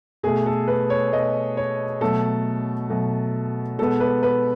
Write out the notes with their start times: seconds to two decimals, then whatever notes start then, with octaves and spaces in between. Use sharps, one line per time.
0.23 B2 A3 G#4
0.46 A4
0.68 B4
0.90 C#5
1.12 B2 A3 D#5
1.57 C#5
2.01 B2 F#3 A3 A4
2.90 B2 F#3 A3
3.78 B2 G#3 B3 A4
4.00 B4
4.23 B4